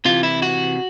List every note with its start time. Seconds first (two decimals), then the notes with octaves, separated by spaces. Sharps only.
0.05 C3 E3 F4
0.23 E4
0.42 F#4